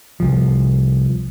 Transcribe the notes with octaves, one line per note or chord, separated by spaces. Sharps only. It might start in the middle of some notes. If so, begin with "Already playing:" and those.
C2 F3